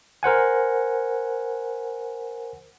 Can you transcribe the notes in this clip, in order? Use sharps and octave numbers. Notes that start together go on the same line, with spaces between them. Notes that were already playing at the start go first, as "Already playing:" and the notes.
A#4 C5 F#5 G#5